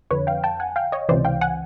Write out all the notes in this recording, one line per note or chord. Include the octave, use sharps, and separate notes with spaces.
F2 D3 B4 C#5
F5 G5
G5 A5
F#5 G#5
F5 G5
C#5 D#5
C#2 C3 E3 C5 D5
F5 G5
F#5 G#5